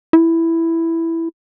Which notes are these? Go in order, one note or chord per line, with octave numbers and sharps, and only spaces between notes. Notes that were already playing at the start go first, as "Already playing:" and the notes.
E4